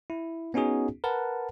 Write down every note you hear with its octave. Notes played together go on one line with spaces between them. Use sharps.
E4
B3 C#4 D#4 F#4 G#4
A#4 B4 F#5 A5